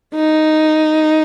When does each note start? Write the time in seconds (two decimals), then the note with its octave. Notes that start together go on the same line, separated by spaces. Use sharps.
0.15 D#4